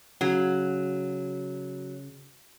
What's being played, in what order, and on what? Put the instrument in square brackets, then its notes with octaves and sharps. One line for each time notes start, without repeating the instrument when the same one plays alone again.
[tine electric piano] C#3 [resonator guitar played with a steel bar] F#3